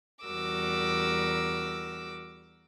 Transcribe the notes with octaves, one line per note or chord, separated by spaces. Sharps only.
E2 G3 F#4 A#4 D6 E6